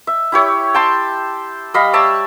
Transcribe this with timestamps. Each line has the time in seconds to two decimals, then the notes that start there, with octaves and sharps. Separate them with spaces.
0.07 E5
0.32 E4 G4 C#5
0.74 G5 A5 C6
1.74 G3 D#5 F5 B5
1.93 C#5 D5 E5 A5